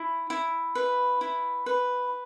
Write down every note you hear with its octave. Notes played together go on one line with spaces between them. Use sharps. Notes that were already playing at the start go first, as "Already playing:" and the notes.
Already playing: E4
E4
B4
E4
B4